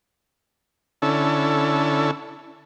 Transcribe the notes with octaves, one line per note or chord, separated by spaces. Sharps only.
D3 C#4 E4 A4